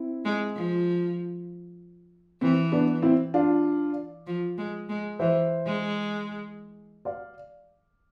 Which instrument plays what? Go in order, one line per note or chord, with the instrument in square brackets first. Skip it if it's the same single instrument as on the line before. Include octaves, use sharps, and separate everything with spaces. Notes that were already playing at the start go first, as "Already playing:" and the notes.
Already playing: [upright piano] C4 E4
[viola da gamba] G#3
F3
[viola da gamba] E3 [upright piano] C4
[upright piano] B3 D4
C4 E4
D4 F4
[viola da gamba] F3
G#3
G#3
[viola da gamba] E3 [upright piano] C5 E5
[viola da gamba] G#3
[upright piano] D5 F5